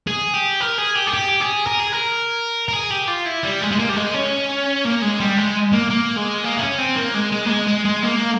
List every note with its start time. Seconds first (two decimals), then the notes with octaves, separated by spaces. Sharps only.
0.07 G#4
0.34 G4
0.61 A#4
0.78 G#4
0.96 G4
1.07 G#4
1.14 G4
1.40 G#4
1.67 A#4
1.79 G#4
1.92 A#4
2.68 A#4
2.73 G#4
2.90 G4
3.08 F4
3.25 E4
3.43 G3
3.61 G#3
3.71 G#3
3.79 A#3
3.89 G3
3.96 G#3
4.14 C#4
4.85 A#3
5.02 G#3
5.20 G3
5.37 G#3
5.73 A#3
5.90 A#3
6.17 G#3
6.44 A#3
6.57 E4
6.62 C#4
6.79 C4
6.97 A#3
7.15 G#3
7.32 G#3
7.46 A#3
7.50 G#3
7.67 G#3
7.85 G#3
8.03 A#3